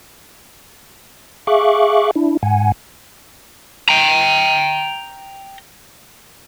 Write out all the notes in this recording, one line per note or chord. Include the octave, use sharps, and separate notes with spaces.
G#4 E5 F5 C#6 D6 F#6
D4 E4
G#2 F#5 G#5
G5 A#5